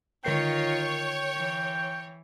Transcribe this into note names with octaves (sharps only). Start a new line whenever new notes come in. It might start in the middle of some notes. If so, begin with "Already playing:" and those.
D3 D#3 F4 A#4 C#5 G5 C7
E3